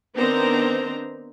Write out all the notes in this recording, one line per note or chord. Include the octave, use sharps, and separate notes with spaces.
D#3 B3 C4 D4 C5 A#5